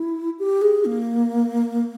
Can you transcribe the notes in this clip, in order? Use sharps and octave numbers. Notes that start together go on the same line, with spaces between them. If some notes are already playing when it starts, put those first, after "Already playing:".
Already playing: E4
G4
G#4
A#3